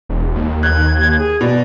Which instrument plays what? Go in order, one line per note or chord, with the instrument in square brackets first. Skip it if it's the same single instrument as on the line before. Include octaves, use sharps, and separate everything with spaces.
[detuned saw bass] E1
D#2
[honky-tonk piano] F#6 [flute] G#6
[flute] G#4
[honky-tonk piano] B2 [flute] D5